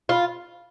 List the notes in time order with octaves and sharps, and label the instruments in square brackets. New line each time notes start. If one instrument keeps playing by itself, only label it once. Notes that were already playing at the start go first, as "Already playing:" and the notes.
[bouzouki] F4